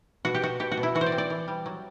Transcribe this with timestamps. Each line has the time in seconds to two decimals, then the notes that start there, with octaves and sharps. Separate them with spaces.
0.25 B2 F#4
0.35 G4
0.42 B2 F#4
0.60 B2 G4
0.72 F#4
0.77 B2
0.83 E4
0.95 E3 F#4
1.01 C5
1.06 D5
1.12 C4
1.18 D5
1.30 E3
1.48 G3
1.66 F#3